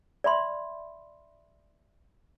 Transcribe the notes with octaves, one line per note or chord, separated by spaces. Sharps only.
D5 E5 B5 C6